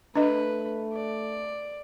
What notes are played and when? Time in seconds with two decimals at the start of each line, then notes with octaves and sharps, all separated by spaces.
0.16 A3 D4 B4 D#5
0.94 D5